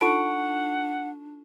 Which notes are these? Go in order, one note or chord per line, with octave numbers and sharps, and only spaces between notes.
D4 D#4 F4 A4 F#5 C#6 D7